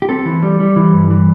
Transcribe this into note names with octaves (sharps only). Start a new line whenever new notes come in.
G4
C4 A4
E3
G3
G3
E3
G2
E3